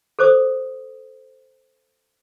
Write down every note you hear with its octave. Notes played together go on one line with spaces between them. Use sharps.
A4 C5 D6 D#6